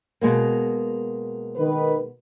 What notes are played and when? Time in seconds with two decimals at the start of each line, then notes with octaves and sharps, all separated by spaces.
0.21 B2 G#3 A#3
1.56 D#3 B4